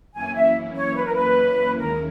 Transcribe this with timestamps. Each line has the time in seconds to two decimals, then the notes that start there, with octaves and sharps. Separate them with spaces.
0.14 F#2 E3 A#3 C#4 E4 G#5
0.35 E5
0.75 C#5
0.96 B4
1.06 A#4
1.14 B4
1.77 D#2 D#3 G#3 C#4 E4 A#4